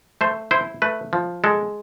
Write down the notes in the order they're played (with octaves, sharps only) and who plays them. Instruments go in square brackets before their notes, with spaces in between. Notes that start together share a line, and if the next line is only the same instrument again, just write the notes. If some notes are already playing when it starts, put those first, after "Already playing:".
[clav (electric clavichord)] A3 C5
E4 C5
A3 B4
F3
G#3 A4